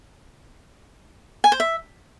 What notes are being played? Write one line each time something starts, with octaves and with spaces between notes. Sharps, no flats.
G#5
C5
E5